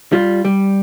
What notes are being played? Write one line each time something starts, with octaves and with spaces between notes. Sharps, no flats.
G3 F4
G3